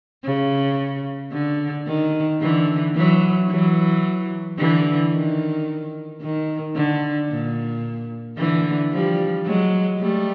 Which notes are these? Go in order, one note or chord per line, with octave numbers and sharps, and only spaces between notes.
C#3
D3
D#3
D3 E3
E3 F#3
E3 F#3
D3 E3
D#3
D#3
D3
A#2
D3 E3
F3 G3
F#3 G#3
G3 A3